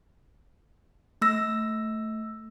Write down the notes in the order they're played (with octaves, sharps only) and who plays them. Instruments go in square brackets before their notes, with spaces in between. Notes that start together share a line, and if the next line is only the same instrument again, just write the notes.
[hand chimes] A3 E6 A#6